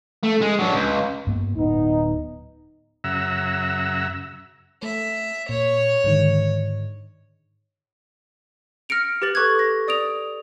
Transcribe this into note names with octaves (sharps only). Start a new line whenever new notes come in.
A3
G#3
F#3 D4
C#2
G2 A#3 B3
D1 B3 D#4
F#2 C#3 E5 F#5 A#5 E6
A3 E5
A#2 C#5
G#2 D3 D#3
F6 A#6 C#7 D7 F7
G4 B4 A6 F#7
A4 B4 C#6 D6 F#6 G#6
A#6
D5 D#6 D7 F7